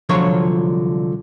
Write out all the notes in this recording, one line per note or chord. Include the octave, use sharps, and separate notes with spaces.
C2 D3 F3 F#3 F4 C#5